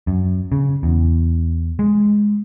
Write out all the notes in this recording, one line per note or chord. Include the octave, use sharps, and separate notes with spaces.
F#2
C#3
E2
G#3